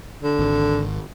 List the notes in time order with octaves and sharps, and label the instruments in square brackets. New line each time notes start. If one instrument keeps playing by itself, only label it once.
[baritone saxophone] D3
[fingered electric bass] G#1